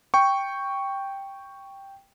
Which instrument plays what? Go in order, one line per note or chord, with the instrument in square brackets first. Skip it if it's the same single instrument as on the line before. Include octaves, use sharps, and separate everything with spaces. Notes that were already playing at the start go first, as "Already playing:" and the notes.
[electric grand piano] G5 C#6